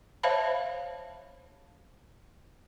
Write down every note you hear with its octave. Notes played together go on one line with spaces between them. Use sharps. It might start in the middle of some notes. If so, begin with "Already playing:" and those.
C5 C#5 E5 F5 A5 B5